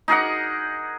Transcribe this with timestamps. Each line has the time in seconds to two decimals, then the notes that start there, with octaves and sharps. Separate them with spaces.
0.08 D#4 G#4 A#4 F#5